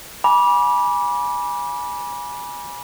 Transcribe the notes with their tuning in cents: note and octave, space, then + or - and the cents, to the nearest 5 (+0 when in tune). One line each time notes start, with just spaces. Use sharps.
G#5 +0 B5 -30 D6 -10